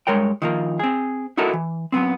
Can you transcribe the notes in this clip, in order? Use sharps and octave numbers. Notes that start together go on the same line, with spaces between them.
G2 G#3 A#4 C#5 G5
D#3 F3 A#3
C4 G#4
D#4 E4 F#4 A4 A#4 C5
E3
F#2 F#3 B3 C4